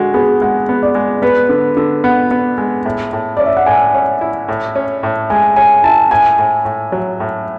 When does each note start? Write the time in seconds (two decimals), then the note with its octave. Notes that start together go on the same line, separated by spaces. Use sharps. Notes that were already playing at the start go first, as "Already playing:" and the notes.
Already playing: D3 G#3 F#4
0.14 B3 G#4
0.41 G#3 F#5
0.69 B3
0.83 D5
0.95 G#3
1.22 B3 B4
1.49 D3
1.77 D3
2.04 B3 F#5
2.31 B3
2.58 G#3
2.85 A2
3.13 A2
3.37 C#4 D5
3.46 E5
3.57 F#5
3.66 A2 G#5
3.94 C#4
4.21 E4
4.48 A2
4.76 C#4
5.03 A2
5.30 G#3 G#5
5.56 C#4 G#5
5.84 E4 A5
6.11 A2 G#5
6.38 A2
6.65 A2
6.92 F#3
7.20 A2